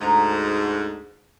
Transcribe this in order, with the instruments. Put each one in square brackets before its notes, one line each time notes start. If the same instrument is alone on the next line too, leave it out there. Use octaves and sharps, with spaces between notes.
[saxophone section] D2 G#2 [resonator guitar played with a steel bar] D#4 A#5